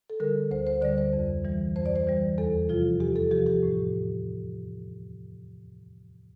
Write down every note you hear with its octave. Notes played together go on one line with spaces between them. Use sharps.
A4
D3 G3 A#4
D2 C5
C5
D3 G3 D5
C5
F2
E3 G3
F2 C5
D5
C5
E3 G3
E2 A4
C3 F3 F4
E2 G4
A4
C3 F3 G4
G4
A2